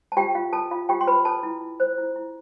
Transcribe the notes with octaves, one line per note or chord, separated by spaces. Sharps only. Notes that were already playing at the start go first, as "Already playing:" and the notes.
A5
F4 G4 G5
F4 F5
F4 A4 A5
F4 F5
F4 G4 G5
C6
F4 B4 B5
A4 A5
E4
E4
C5
E4
E4